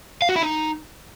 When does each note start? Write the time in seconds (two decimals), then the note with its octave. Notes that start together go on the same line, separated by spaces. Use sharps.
0.22 F5
0.29 F#4
0.36 E4
0.43 D#4